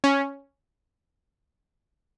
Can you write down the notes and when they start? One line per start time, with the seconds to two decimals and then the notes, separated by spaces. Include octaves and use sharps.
0.04 C#4